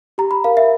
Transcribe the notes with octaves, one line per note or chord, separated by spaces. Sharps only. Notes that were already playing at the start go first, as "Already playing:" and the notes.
G4 A#5
B5
A#4 F5
E5